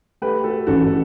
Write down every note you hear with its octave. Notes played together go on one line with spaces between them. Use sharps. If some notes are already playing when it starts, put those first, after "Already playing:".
A3 G4 B4
F#4 A4
A1 F#4 A4